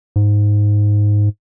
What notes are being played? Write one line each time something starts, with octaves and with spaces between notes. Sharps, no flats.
G#2